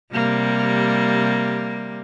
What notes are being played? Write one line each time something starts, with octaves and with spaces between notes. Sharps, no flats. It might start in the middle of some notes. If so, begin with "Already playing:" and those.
C3 G3 A#3